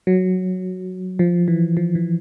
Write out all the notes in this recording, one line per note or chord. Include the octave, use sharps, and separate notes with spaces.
F#3
F3
E3
F3
E3